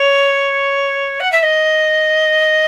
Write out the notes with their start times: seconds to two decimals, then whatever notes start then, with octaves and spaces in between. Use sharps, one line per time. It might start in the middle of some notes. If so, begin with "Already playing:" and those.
Already playing: C#5
1.19 F#5
1.31 E5
1.42 D#5